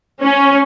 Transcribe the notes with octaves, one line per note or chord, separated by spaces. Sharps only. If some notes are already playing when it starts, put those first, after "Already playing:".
C#4